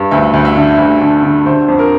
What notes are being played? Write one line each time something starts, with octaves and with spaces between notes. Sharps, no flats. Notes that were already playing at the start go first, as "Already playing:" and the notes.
Already playing: G2
D2 E5
D2
E5
D3
D2
D3
D3
D3 C5
F2
A#4